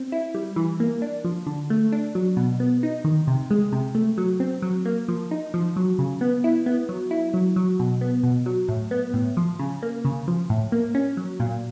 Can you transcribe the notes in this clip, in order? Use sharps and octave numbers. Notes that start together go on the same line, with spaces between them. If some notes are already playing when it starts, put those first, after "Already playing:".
Already playing: C4
E4
G3
E3
A#3
D4
F3
D3
A3
D4
F#3
B2
B3
D#4
D#3
C3
G#3
C3
A3
F#3
C4
F#3
A#3
F3
D#4
F3
F#3
C#3
B3
E4
B3
F#3
E4
F#3
F#3
B2
B3
B2
F#3
A2
B3
A2
F3
C#3
A#3
C#3
F3
A2
A#3
C#4
F#3
A#2